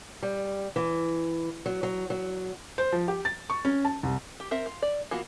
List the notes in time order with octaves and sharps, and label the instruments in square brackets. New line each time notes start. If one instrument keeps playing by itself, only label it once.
[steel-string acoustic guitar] G3
E3
F#3
F#3
F#3
[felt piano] C5
F3
G4
A6
C#6
C#4
A5
C2
[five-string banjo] G4
C4 A#4 E5
F4
D5
E3 A#3 B3 F4 F#4